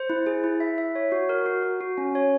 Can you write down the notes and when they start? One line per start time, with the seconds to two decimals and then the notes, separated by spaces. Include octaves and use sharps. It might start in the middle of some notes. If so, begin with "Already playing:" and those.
Already playing: C5
0.10 E4
0.26 G#4
0.44 E4
0.60 E5
0.78 E5
0.95 C#5
1.12 F#4
1.29 A#4
1.46 F#4
1.63 F#4
1.81 F#4
1.98 C#4
2.15 C#5